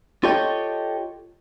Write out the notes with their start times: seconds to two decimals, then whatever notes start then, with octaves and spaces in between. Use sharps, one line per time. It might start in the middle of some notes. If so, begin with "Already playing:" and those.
0.24 F4 G4 A4 C#5 D#5 G5